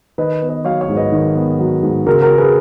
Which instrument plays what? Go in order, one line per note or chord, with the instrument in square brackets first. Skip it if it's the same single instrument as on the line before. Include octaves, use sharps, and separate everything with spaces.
[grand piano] D#3 B4 D#5
B3
B4 D#5
F#3 C#5 F5
C#5 F5
G#2
B4 D#5
D#3
B3
F#3
G#2
C#3 F#4 A#4
F#4 A#4
C#4
G#4 B4